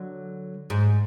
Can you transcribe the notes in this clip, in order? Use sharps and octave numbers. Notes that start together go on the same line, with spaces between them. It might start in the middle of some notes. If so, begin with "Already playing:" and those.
Already playing: D3 F#3
G#2